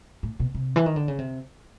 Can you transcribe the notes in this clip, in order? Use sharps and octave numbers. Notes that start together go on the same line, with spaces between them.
A2
B2
C3
E3
D#3
D3
C#3
C3